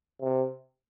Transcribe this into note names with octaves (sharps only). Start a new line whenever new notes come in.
C3